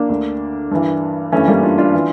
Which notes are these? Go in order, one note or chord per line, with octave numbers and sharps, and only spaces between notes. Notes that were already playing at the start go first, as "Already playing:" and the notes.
Already playing: A#3 D4
D2 D3
G2 E3
G2 E3 A3 C#4
G3 A#3
D4 F4
D4 F4
E3